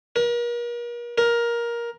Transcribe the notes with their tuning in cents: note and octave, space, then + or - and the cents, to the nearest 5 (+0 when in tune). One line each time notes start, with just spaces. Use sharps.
A#4 +40
A#4 +15